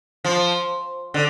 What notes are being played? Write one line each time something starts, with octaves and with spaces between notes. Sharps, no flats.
F3
D3